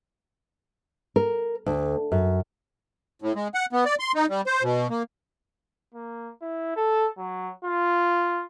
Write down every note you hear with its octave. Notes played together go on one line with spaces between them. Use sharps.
A#4
D2
F#2
A2
G#3
F#5
B3
D5
C6
D#4
G3
C5
B2
A#3
A#3
E4
A4
F#3
F4